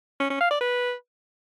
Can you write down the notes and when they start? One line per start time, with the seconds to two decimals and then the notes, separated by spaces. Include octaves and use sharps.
0.20 C#4
0.30 C#4
0.40 F5
0.51 D5
0.61 B4